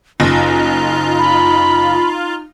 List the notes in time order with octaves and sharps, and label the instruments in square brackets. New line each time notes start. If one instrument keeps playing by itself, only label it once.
[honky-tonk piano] F#1 [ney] D#4 [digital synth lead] F4
[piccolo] B5